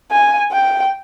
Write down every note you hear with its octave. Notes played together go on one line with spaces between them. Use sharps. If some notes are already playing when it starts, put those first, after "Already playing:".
G#5
G5